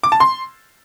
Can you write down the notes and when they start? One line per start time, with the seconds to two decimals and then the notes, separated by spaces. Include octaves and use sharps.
0.03 D6
0.12 A5
0.20 C6